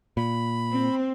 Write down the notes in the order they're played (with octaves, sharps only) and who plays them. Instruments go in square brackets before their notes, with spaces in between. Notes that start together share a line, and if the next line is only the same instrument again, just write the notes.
[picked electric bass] A#2 [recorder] B5
[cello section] C4